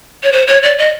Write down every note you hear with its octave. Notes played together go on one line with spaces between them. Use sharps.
C#5
C5
C#5
D5
D#5